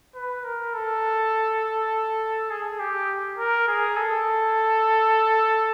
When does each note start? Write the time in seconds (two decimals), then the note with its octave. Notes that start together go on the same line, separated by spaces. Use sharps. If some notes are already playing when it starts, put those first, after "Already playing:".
0.14 B4
0.44 A#4
0.74 A4
2.50 G#4
2.80 G4
3.38 A#4
3.68 G#4
3.97 A4